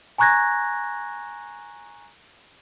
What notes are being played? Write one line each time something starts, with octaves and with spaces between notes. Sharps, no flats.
G#5 A#5 C#6 F#6 G#6 A#6